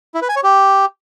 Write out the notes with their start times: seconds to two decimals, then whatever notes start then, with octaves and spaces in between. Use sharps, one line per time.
0.15 E4
0.22 B4
0.29 G#5
0.36 C#5
0.43 G4